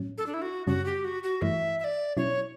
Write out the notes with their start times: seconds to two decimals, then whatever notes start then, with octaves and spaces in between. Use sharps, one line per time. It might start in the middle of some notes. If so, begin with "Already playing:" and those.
Already playing: A2 F#3 C#4
0.18 A4
0.26 D4
0.34 E4
0.42 F#4
0.67 F#2 C#3 G3 C#4 F#4
0.86 G4
1.04 F#4
1.23 F#4
1.42 G2 E3 A3 E4 E5
1.79 E5
1.84 D5
2.17 B2 F#3 C#4 E4 C#5